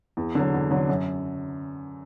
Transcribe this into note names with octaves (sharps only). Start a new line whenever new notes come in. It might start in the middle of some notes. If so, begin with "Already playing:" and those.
E2
D3 F#3
E2
D3 F#3
F#2